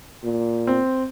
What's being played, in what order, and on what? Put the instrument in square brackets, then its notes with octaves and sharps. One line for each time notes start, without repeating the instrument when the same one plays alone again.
[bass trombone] A#2
[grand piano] C4